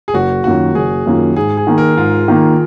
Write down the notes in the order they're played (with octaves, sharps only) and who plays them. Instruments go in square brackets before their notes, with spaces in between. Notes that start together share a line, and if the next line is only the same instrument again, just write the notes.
[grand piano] G#4
[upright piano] F#1 [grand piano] F#4
[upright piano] F#2 D#3 A#3 F4 [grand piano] F#4
[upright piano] F#1 [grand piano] G#4
[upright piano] F#2 D#3 A#3 F4
[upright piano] G#2 [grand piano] G#4
[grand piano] G#4
[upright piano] D#3 A#3
[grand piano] A#4
[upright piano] G#2 [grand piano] F4
[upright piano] D#3 A#3